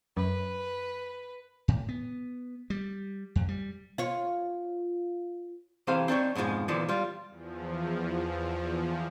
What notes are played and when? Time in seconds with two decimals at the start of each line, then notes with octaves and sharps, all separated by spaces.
0.17 F#2 B4
1.68 A2
1.89 B3
2.70 G3
3.36 F2
3.48 G3
3.98 F4 C#5
5.87 C3 E3 C4 A4 C5 F5
6.08 C4 D4 D#4 C#5
6.35 F2 G#2 B2 F3 G#3
6.68 D#2 A#2 D3 E3 F3 B3
6.88 G3 F4
7.29 E2 F3